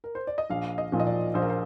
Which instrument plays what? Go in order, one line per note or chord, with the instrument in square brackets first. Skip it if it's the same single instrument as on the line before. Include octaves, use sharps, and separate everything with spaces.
[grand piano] A#4
C5
D5
D#5
[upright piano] A#1 [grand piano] F5
[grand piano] D#5
[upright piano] A#2 F3
[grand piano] D#5
D5
[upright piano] A#1 [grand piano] C5
[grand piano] A#4
C5